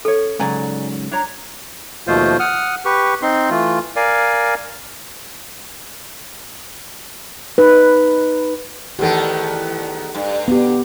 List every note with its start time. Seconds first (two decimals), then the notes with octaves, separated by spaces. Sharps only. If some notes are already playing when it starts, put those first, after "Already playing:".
0.05 C#4 A4 C#5
0.39 G#2 C#3 F#3 D5 G#5 A#5
1.11 D4 C#5 A#5
2.07 D#2 B2 F3 A3 F4 C5
2.40 F#5 D#6 F6
2.85 G4 B4 C#6
3.22 C4 D#4 C6
3.50 E3 A3 F4
3.96 A#4 D5 F5 G#5
7.58 D#4 B4
8.99 E2 D#3 B3 G4 A4
10.15 G2
10.48 B3 G4